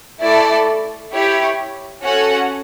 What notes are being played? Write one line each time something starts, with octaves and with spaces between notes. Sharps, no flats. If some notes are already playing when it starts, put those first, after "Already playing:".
A3 E4 A4 D5 A5
E4 G4 C#5
C#4 F#4 A4 C#5 F#5